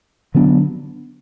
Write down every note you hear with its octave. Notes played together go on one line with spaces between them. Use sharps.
D3 F#3 B3 D4